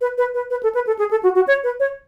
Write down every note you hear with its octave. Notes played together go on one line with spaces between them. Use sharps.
B4
B4
B4
B4
A4
B4
A4
G#4
A4
F#4
F#4
C#5
B4
C#5